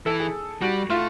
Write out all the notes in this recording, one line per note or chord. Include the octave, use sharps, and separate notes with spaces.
E3 A4
G#4
G3 F#4
A3 F4